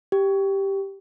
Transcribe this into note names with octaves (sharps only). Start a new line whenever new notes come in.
G4